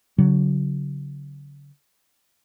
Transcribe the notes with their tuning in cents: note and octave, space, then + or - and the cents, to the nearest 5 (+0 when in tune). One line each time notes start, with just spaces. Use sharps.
D3 -45 F#3 +5